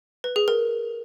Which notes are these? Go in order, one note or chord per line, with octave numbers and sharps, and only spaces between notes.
B4
G#4
A#4